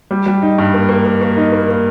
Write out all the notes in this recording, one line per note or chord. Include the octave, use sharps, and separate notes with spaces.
G3
G3
D#4
G2
A#3
A#3
A#3
A#3
D#4
A#3
A#3